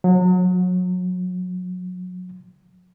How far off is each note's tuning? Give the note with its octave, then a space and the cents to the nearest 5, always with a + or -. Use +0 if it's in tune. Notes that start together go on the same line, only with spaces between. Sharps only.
F#3 -30